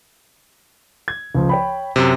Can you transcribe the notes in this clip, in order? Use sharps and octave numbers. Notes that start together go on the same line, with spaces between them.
G#6
C#2 F3
C#5 G5 B5
F#2 C3